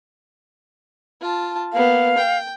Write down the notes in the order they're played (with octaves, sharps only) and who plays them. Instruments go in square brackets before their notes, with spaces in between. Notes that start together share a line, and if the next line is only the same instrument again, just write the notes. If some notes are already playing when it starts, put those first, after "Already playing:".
[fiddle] F4 A5
[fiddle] A#3 B3 [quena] F5
[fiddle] G5